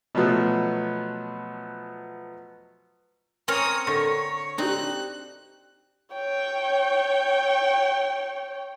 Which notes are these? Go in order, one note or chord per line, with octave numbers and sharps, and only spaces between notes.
B2 F3 F#3 A3 B3
C4 C#4 A#4 C#5 D#6
D3 C#5 C#6 A#6 C#7
C4 D4 D#4 G4 F#6
C#5 G5